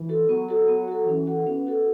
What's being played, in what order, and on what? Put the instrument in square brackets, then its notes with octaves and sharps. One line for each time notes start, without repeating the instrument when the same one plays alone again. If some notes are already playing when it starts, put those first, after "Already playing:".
Already playing: [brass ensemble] E3
[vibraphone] F#4 A4
[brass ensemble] F#3 [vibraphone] B3
[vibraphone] F#4 A4
B3
F#4 A4
[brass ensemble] E3 [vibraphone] C#4
[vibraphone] F#4 A4 F#5
[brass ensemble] B3 [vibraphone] C#4
[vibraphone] F#4 A4 F#5